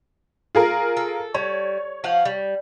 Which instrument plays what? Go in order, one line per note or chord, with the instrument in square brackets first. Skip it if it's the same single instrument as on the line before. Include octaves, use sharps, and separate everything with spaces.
[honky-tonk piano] F4 G#4 A#4
[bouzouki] A4
[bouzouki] G3 [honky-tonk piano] C#5
[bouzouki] F3 F5 F#5
G3